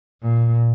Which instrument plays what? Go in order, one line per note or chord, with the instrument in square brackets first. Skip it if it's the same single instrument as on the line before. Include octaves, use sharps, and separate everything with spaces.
[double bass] A#2